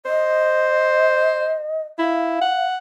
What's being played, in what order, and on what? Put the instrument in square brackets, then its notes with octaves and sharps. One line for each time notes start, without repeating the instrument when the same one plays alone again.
[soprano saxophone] C5 [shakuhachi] D#5
[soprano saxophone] E4 [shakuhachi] F5
[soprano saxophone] F#5